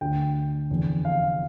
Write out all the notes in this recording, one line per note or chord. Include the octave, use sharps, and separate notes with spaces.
D2 D3 G5
F1 E2 D3
F5